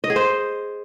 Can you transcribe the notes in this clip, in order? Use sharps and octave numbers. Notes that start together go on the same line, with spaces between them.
D#5
G#4
C5